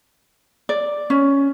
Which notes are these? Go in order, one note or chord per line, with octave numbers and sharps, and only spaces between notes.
D5
C#4